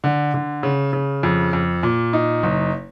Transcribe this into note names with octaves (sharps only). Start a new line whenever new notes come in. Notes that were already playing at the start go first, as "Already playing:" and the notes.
D3
D3
C#3
C#3
F2
F2
A#2
D#4
F#1